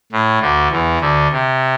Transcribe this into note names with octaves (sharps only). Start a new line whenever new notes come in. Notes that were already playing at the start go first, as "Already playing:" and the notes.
A2
D2 D3
E2 E3
D2 D3
C3